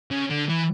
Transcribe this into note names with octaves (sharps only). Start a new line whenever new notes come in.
C#3
D3
E3